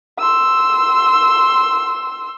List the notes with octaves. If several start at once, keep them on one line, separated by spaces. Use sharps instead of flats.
C6 E6